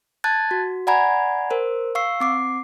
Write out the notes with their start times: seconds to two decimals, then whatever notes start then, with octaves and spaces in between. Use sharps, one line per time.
0.24 A5 F#6 G#6 A6
0.51 F#4
0.87 D5 F#5 G#5 A#5 B5 G#6
1.50 A#4 C5
1.95 F5 C#6 E6 C7
2.20 C4 D6 C7